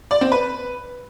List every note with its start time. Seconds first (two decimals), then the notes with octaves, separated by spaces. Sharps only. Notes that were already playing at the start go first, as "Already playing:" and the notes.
0.11 D5
0.21 C4
0.32 B4